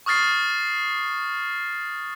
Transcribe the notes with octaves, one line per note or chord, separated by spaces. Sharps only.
C#6 D#6 F6 A6 C7